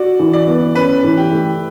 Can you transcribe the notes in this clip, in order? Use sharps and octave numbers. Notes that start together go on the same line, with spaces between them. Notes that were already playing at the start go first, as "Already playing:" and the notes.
Already playing: F#4 D5
E3
D5
B3
C#4 B4
E3
G4
A3